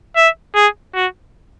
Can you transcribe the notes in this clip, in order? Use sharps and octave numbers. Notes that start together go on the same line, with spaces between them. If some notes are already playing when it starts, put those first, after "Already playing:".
E5
G#4
F#4